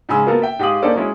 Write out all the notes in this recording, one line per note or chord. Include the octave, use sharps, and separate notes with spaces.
G#2 C#3 G#3 G#5 E6
A#3 B3 F4 F#4 A4 A#4
E5 G5
G#2 G4 G#4 F5 D#6 F#7
A#3 C#4 D#4 A4 C5 D5
F#3 G#3 C#4 E4